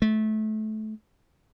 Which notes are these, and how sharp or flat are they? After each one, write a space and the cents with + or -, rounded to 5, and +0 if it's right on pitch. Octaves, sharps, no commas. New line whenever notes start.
A3 -25